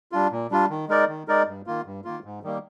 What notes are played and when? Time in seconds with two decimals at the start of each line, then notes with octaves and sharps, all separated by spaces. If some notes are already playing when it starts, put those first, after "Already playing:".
0.12 G3 D4 F4
0.32 A#2
0.51 G3 D4 F4
0.70 D#3
0.89 G#3 D#4 A#4 D5
1.08 D#3
1.28 G#3 D#4 A#4 D5
1.46 G2
1.67 D#3 A#3 F4
1.85 G2
2.04 D#3 A#3 F4
2.24 G#2
2.43 D#3 G3 A#3